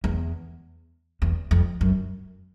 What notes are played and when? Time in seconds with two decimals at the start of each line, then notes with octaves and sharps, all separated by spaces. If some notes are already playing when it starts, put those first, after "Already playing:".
0.04 E2
1.22 E2
1.51 F2
1.81 F#2